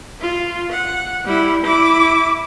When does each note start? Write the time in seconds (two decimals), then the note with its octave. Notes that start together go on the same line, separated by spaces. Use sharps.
0.21 F4
0.72 F#5
1.25 G3 E4
1.65 E4 D6